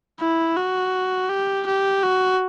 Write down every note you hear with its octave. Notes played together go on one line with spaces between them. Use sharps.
E4
F#4
G4
G4
F#4